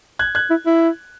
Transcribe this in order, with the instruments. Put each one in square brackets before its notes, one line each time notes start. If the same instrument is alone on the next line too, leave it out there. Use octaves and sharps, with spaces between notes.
[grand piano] F#6 G#6
F#6 G#6
[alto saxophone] E4
E4